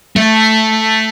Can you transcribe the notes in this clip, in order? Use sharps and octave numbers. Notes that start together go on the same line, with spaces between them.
A3